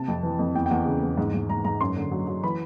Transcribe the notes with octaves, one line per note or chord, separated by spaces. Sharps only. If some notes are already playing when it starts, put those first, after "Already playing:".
Already playing: C3 A5
F2
E3
F2
E2 G5
G5
E2 F#5
C#3
E2
G#2
G#2
G#2 A#5
G#2 A#5
F#2 C6
D3
F#3
F#3
E3 B5